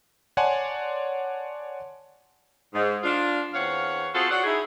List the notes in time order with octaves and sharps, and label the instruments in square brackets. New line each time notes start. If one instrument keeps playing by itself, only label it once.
[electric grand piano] C#5 D5 F#5 G#5 A5 C6
[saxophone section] G#2
D4 F4
E2 C4 C#5 F5 F#5
C4 F4 F#4 G#4 A4 C5
F#4 C#5 D5 F#5
D#4 E4 G#4